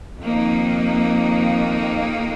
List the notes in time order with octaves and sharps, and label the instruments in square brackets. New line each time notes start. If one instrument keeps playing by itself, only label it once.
[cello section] F2 D#3 A#3 D#4